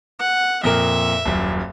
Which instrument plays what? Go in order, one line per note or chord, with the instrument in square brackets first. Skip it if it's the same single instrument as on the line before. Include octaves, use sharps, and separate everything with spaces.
[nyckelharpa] F#5
[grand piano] F2 A#2 A#4 [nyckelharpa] E5
[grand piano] D#1 F#2